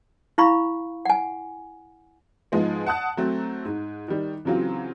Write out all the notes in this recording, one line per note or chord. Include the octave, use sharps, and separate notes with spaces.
E4 F5 B5 C#6
F#5 G#5
G#2 F3 G#3 B3
F#5 A5 D#6 F#6
F#3 A3 C4
G#2
D#3 G3
C#3 E3 F#3 C4 F4